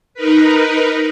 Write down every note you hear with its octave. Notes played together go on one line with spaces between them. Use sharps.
D#4 A#4 B4